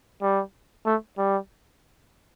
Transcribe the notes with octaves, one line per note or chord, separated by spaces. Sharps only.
G3
A3
G3